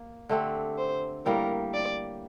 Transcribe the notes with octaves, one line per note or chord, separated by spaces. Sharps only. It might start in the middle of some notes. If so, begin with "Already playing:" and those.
Already playing: A#3
D3 A3 C4 G4
C5
A2 G3 A#3 A#4
D5